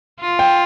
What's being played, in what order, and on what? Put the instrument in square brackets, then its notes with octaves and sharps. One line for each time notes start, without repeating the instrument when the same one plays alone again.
[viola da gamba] F4
[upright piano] G5